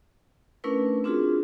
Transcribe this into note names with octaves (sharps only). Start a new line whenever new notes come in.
A3 C#4 D4 E4 A#4 B4
C4 D4 F4 F#4 G#4